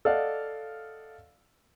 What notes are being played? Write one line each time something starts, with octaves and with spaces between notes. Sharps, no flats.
A4 D5 D#5 F5 F#5